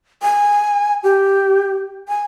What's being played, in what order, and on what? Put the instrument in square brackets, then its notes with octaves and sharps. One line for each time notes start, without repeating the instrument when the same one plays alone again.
[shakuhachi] G#5
G4
G#5